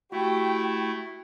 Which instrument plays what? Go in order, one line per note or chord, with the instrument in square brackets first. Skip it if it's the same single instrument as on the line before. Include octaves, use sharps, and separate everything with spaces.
[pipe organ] A3 E4 [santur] F#4 [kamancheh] G4 G5